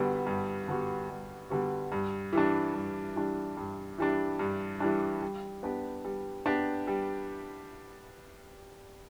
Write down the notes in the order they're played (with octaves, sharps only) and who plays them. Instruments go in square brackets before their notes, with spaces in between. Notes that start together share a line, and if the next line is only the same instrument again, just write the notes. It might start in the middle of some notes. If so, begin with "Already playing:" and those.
Already playing: [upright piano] G2 D3 G3 B3 F#4
G2
D3 G3 B3 F#4
G2
D3 G3 B3 F#4
G2
E3 G3 D4
G2
E3 G3 D4
G2
E3 G3 D4
G2
E3 G3 D4
G3
B3 D4 G4
G3
B3 D4 G4
G3